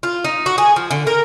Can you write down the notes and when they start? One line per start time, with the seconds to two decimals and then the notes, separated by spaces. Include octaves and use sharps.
0.03 F4
0.25 D#4
0.46 F#4
0.58 G#4
0.76 F3
0.91 D3
1.07 A#4